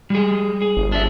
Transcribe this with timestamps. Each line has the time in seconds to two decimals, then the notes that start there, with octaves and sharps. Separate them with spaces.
0.10 G3 G#4
0.62 G#4
0.77 G1
0.92 D4 E5